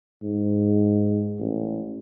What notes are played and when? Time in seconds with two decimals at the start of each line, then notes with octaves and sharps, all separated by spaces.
0.23 G#2
1.39 A1